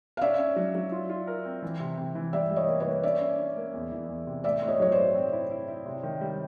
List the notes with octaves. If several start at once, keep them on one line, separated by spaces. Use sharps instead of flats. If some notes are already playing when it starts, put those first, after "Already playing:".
F5
C#4 D5 E5
C#4
F#3
F#3
F4
F4
A#4
C4
E3
C3
C3
E3
G3 D5 E5
G3
C#5 D#5
A#3
B4 C#5
A#3
C#4 D5 E5
C#4
C#4
A#3
E2
E3
E2
C3
A2 D5 E5
A2
C#5 D#5
F#3 C#5
C5 D5
A2
C4
E4
E4
E4
C3
D#3
G3